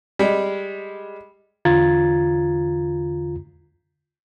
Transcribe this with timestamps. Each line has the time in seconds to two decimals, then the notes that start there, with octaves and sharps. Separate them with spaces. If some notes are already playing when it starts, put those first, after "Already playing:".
0.19 G3 G#3
1.65 E2 D3 F4 A#5 G#6 A6